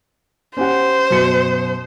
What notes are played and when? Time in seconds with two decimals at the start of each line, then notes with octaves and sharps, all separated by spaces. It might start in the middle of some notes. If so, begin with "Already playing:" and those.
0.57 C#4 G4 C5 F#5
1.10 F#2 B2 C#7